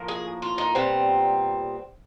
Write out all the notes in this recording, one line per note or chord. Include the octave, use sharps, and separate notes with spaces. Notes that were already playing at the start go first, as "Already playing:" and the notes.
Already playing: A2 F3 A#3
G#4
F4
D#4
A#2 G3 B3 C4